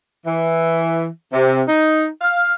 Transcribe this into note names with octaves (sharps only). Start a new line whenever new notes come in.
E3
C3
D#4
F5